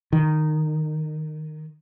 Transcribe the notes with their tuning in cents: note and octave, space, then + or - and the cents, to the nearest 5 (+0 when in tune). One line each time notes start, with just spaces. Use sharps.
D#3 -15